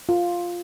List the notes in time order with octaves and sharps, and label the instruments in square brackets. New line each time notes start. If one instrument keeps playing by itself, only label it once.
[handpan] F4